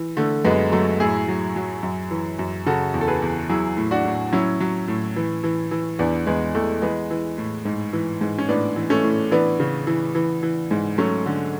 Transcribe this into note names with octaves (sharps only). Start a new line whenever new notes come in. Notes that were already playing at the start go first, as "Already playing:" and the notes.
Already playing: E3
D3 A3
F#2 G#3 B3
F#3 A3
A2 E4 G#4
F#3
F#3
F#2
E3
F#2
C#3 F#4 A4
E2
A4
G#4 B4
E2
F#3 E4 G#4
A2
D4 F#4
A2
F#3 C#4 E4
F#3
A2
E3
E3
E3
E2 B3 D4
E2 G#3 B3
E2 A3
E3 G#3 B3
E3
A2
G#2
E3
G#2
C#4
A2 B3 D4
E3
A3 C#4
A2
E3 B3 D4
C#3
E3
E3
E3
G#2
F#3 A3 C#4
D3